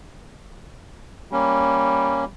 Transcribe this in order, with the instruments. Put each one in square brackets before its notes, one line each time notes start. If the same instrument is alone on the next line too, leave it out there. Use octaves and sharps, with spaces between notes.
[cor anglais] G3 [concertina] A#3 C#4